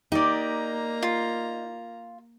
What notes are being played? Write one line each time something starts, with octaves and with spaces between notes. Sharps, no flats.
A#3 D#4 G4 D5 A#5
F4